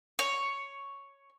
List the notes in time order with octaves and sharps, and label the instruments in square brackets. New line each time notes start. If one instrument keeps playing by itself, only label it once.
[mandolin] C#5